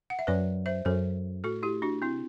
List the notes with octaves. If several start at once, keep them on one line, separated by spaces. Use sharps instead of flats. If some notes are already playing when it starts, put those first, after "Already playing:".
F#5
E5
F#2 B4 D5
C5 E5
F#2 A4 C5
A2 F#4 A4
E4 G4
D4 F#4
C3 C4 E4